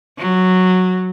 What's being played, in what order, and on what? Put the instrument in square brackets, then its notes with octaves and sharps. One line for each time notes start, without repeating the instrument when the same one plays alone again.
[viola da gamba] F#3